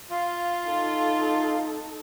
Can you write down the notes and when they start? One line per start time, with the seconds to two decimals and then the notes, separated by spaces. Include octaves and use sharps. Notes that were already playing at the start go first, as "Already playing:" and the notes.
0.11 F4 F5
0.66 D#4 A4